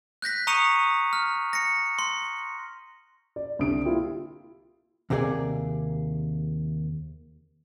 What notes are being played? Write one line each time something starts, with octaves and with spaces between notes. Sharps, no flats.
F#6 G6 A#6 B6
A#5 C#6 D#6 C#7 D#7 F7
F6
A#6 C#7
C6
D5
C2 D3 D#6 D7
A#3 E4 F4 G4
D#2 C3 A#3 G4 G#4 D5